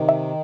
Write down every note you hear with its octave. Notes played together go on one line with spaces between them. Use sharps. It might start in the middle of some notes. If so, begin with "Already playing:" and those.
Already playing: C3 D#3
E5